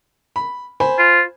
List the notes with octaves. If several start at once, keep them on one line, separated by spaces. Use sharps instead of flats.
B5
C5 G#5 B5
F4